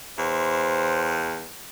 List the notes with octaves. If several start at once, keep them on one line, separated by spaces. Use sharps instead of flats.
E2 C5